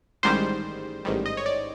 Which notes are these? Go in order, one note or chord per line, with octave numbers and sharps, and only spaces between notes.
A1 G#2 D#3 G3 C5
A1 G#2 D#3 G3
D#5
C#5
D5